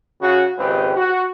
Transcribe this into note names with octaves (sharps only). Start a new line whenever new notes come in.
C#3 F#4
G#1 C#2 C4 G4 B4
F#4